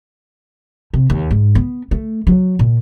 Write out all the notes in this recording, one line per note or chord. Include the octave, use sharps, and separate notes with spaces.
C3
D#2
G#2
B3
A3
F#3
A#2